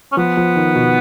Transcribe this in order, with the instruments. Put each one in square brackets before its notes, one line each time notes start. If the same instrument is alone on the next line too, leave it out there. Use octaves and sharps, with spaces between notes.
[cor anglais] C#4
[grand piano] F3 [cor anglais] B3
[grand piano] F3
D#3
B2